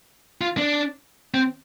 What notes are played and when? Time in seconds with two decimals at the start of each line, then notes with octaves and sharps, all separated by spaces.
0.41 F4
0.58 D4
1.34 C4